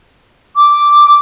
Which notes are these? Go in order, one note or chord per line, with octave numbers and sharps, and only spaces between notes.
D6